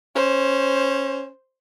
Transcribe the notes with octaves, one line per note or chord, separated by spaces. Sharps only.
C#4 C5